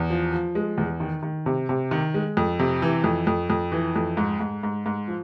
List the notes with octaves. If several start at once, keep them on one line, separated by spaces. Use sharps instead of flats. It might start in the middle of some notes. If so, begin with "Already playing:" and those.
Already playing: E2
F3
F3
G#3
E2
D#3
D#3
C3
C3
D#3
G#3
F2
C3
E3
F2
F2
F2
E3
F2
G#2
G#2
G#2
G#2
F3